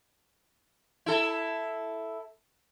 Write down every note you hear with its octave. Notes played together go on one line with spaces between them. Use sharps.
E4 A4